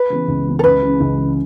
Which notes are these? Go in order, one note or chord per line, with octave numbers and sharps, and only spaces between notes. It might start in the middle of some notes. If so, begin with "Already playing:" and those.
Already playing: B4
C#3 E3 B3
C#2
C#3 E3 B3
A4
C#2 B4
C#3 E3
C#2
C#3 E3